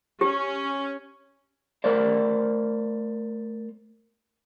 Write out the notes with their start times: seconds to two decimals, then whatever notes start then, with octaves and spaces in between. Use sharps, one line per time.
0.21 C#4 G4
1.84 A3 A#4 C5 D5